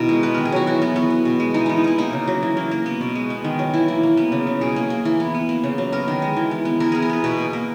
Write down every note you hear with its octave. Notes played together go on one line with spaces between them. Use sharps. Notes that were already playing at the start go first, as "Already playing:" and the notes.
Already playing: B2 D#3 E4 F#4 A#4
G#3
B3 B4
D#3 A#4
G#4
F#3 F#4
E3 F#4
B3
B3
B3
B2
G#3
E3 D#4
B3 D#4
D#4
B3 E4
A#3 D#4
C#3
F#3
E3
A#3
A#3
B3
B2
G#3
B3
D#3
F#3
E3 E4
A#3
A#3
B3
C#3
F#3
B2 G#4
A#3
A#3
E3
B3
B3
A#3
C#3
F#3
B3 A#4
D#3
G#3
E3
B3
B3
E3 A#4
B3 G#4
A#4
B3 B4
B2 B4
A#3
A#3